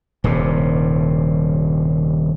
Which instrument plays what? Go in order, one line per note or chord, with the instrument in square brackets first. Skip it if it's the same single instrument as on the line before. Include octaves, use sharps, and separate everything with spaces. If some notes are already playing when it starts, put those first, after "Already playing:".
[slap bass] D#1 G2 C3